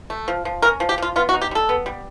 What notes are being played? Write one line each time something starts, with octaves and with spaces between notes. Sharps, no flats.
A3
F3
F3
C#4 A#4
F3
G4
F3 F4
B3 F4
F#4
D#4
G4
G3 A4
B3
G3